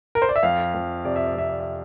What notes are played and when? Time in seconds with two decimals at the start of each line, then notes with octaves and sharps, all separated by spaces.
0.15 A#4
0.22 C5
0.29 D5
0.36 E5
0.43 F2 F5
0.74 F2
1.04 C3 D5
1.16 E5
1.26 D5
1.35 F2 E5
1.49 D5
1.60 E5